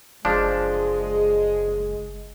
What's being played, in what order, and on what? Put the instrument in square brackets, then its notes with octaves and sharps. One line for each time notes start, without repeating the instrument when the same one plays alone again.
[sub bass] F#1 [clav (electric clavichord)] F3 D4 [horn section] G#3